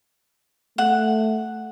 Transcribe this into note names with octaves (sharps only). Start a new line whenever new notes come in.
A3 F#5